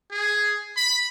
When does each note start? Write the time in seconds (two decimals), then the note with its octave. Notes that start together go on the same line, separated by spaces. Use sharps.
0.11 G#4
0.76 B5